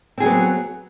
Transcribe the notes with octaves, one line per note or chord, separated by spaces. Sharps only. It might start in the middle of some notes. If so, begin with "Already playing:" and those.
F#3 B3 C4 G#4